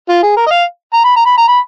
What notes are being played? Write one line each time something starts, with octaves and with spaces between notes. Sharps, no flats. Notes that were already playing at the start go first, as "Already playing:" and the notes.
F4
G#4
A#4
D#5
F5
A#5
B5
A#5
B5
A#5
B5